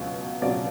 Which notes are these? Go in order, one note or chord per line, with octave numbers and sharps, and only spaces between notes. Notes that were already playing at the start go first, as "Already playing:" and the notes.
Already playing: C#2 B2 F#3
C#2 B2 F#3 D5